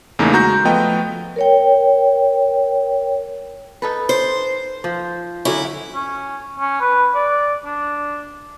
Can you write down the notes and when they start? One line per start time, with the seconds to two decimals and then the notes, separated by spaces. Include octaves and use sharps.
0.19 E2 C#3 A3 A#3 D#4
0.33 G#3 F#4 A#5 G6
0.65 F3 A3 B3 D#5 G5
1.36 A#4 C#5 G5
3.82 D#4 A4 B4
4.09 C5
4.84 F3
5.45 D3 F#3 C#4 E4
5.95 C#4
6.60 C#4
6.81 B4
7.15 D5
7.65 D4